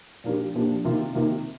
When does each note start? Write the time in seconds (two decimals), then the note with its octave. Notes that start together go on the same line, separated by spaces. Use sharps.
0.24 A#2 F3 A#3 D4 G4
0.54 A#2 F3 A#3 D4 G4
0.85 C3 D#3 A#3 F4
1.14 C3 D#3 A#3 F4